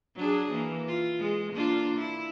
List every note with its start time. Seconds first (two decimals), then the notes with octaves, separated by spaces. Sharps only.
0.16 F#3 D4 G#4
0.52 E3 A#3
0.88 F4
1.19 G#3
1.53 A#3 D4 F4
1.98 E4